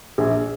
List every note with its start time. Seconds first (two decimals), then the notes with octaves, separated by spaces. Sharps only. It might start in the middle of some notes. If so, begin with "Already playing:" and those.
0.18 A#1 G#4